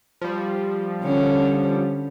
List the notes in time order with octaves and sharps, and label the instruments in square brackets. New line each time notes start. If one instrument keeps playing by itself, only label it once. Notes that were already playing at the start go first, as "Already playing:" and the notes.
[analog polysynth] F3 G3
[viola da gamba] D3 C#4